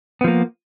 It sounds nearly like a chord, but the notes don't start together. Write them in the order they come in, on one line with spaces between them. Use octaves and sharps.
B3 F3 A#3